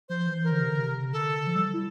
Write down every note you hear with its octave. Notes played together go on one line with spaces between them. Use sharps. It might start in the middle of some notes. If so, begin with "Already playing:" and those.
F3 C5
E3
E3 A#4
D3
C3
D3
C3
D3 A4
F3
G3
E4